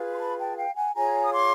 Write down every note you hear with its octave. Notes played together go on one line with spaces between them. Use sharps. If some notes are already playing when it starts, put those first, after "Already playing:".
Already playing: F4 G#4 B4
C6
A5 B5
G5 A5
F5 G5
F#5 G#5
F4 G#4 C#5 G#5 A#5
D#6
C6 D6